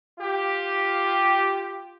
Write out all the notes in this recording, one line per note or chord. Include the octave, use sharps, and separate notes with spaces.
F4 G4